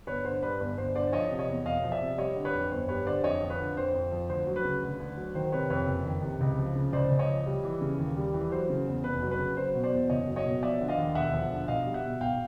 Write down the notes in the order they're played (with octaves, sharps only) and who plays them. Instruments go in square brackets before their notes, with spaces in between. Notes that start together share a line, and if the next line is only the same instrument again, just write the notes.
[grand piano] G1 B4 C#5
D3 C5
G2 B4
G1 B4
G1 C5
D3 C5 D5
F3 C#5 D#5
C3
C#5 D#5
E2
E1 D#5 F5
F3
D5 E5
C3
G3 C#5 D#5
D3
B4 C#5
F2
G1 C5
G3 B4 C#5
D3 C5 D5
F2 C#5 D#5
F3
B4 C#5
D3
F2 C5
F2
F3
D2 C5
F#3
B4
C#3
D2
D2
F#3
D#3 C5
C3 B4 C#5
F2 B4 C#5
F#1
D#3
C3
C#2
F3
C#3
C#2 C5 D5
C#2
C#5 D#5
F3
G3
E3
C#3
D#2
G3
E3
F#3 C5
C#3
E2
F1 B4
F#3
B4
C#3
F#3 C5
B2
C5 D5
E2
F#1 C#5 D#5
F#3
C#5 D#5
B2
F3 D5 E5
D3
D#5 F5
D#2
E1 E5 F#5
F3
D3
B1 D#5 F5
G3
E5 F#5
B2
B1 F5 G5